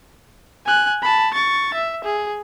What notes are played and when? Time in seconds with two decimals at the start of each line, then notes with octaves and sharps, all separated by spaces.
0.66 G#5 F#6
1.03 A5 B5
1.34 C#6 A6
1.74 E5
2.04 G#4